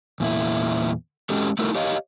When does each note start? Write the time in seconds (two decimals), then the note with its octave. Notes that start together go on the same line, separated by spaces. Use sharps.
0.20 E2 A#2 E4
1.30 G#3 C#4 F#4 G4 A4
1.59 A3 D#4 E4 F#4 A4 A#4
1.75 G4 C#5 D#5 F5